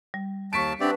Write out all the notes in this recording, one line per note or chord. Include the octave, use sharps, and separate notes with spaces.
G3
D#2 A5 C#6 B6 D7
C4 D4 G4 B4 D5 E5 F#5